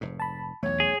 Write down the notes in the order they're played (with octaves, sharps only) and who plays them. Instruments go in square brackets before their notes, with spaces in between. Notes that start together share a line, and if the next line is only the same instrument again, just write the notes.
[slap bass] F1 G#2
[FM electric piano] A5 B5
[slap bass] B1 A3 [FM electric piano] E2 [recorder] C#5
[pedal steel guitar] G#4